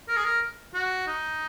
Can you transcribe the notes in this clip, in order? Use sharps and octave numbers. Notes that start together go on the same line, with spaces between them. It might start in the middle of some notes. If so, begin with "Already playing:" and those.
A#4
G#4
A#4
F#4
D#4